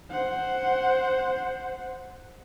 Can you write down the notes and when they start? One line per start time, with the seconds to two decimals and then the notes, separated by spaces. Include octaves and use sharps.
0.11 C5 F#5